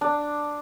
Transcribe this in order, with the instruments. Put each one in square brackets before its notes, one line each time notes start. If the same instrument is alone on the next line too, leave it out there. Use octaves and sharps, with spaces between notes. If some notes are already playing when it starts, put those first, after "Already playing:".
[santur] D4